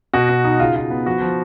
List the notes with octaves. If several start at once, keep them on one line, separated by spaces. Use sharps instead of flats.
B2 F#4
B2
D#4
C#3 F4
F4
B3
F3 F#4
F3